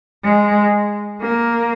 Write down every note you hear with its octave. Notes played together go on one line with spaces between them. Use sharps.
G#3
A#3